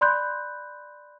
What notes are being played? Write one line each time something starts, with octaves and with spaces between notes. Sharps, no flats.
D5 B5 C6 F#6 G6